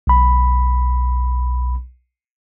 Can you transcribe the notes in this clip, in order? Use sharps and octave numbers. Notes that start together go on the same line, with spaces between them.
B1 B5